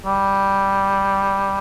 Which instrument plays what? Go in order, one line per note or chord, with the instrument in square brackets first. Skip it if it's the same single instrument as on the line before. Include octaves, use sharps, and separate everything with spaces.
[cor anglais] G3